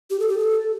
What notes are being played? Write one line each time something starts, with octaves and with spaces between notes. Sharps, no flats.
G4
A4
G4
A4